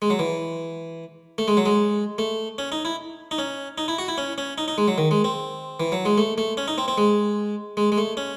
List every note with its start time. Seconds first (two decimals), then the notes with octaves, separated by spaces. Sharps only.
0.02 G#3
0.10 F#3
0.19 E3
1.38 A3
1.48 G#3
1.57 F#3
1.66 G#3
2.18 A3
2.58 C#4
2.72 D#4
2.85 E4
3.31 D#4
3.38 C#4
3.78 D#4
3.88 E4
3.98 F#4
4.08 E4
4.18 C#4
4.38 C#4
4.58 D#4
4.68 D#4
4.78 G#3
4.88 F#3
4.98 D#3
5.11 G#3
5.24 C4
5.80 E3
5.92 F#3
6.05 G#3
6.18 A3
6.38 A3
6.57 C#4
6.68 D#4
6.78 C4
6.88 C4
6.98 G#3
7.77 G#3
7.92 G#3
7.98 A3
8.17 C#4